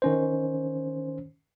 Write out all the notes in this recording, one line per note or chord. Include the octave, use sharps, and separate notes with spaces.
D#3 C#4 C5